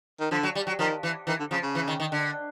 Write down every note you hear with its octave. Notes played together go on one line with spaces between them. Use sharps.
D#3
D3 F3
F#3
G3
F#3
D#3 F3
E3
D#3 E3
D3
C#3 F3
C#3
E3
D#3
D#3
D3